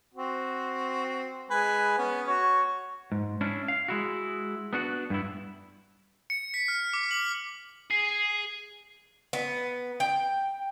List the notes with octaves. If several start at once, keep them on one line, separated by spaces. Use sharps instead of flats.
C4 F#4
G#3 B4 G#5
B3 C#4
F#4 C#5
G#2
C#4 D4 E4
F5
G#3 E4 F#4
B3 D4 F#4
G2 B3 E4
C#7
B6
F6
D6
F#7
G#4 C7
B3
G5